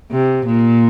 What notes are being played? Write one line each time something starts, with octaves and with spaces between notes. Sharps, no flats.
C3
A#2